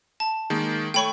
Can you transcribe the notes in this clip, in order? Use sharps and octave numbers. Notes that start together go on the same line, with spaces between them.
A5
D#3 G#3 A#3
A3 C#5 G5 B5 C#6